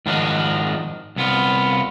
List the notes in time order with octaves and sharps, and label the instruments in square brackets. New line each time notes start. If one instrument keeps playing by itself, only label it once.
[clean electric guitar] G#2 D#3 F3 D4 D#4 F#4
C2 B3 F4